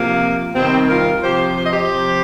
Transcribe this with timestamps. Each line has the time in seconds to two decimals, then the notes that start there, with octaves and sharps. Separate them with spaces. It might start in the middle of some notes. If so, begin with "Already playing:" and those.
Already playing: C3 F3 A#3
0.55 C3 D#3 G3 C4
0.88 F4 A#4
1.22 C3 F3 G4 C5
1.56 C5
1.64 D#5
1.71 G4 C5
1.89 C3 F3